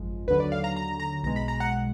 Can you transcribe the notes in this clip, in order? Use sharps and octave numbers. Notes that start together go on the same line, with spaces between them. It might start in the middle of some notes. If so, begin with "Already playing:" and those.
Already playing: G#1 F#2 F3 G#3
D#2 D3 F#3 B4
D5
F5
A#5
A#5
A#5
B1 B2 G#3 A#5
B5
A#5
F#5